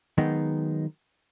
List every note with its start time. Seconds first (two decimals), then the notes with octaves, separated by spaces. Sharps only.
0.18 D#3 F#3 G#3 B3 D#4